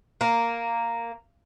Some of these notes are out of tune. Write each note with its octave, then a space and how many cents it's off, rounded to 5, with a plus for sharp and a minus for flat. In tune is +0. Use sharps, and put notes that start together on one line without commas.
A#3 -5